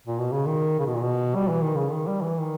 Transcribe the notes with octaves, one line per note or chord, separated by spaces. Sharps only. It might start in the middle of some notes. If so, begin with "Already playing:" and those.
A#2
B2
C#3
D#3
C#3
B2
A#2
B2
G3
E3
D#3
C#3
D#3
G3
E3
D#3